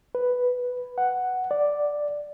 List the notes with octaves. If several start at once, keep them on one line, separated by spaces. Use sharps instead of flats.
B4
F#5
D5